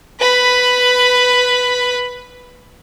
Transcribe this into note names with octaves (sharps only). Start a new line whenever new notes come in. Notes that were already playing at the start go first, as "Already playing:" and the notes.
B4 B5